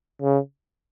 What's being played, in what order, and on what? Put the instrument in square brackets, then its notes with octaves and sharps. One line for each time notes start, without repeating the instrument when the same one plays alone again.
[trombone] C#3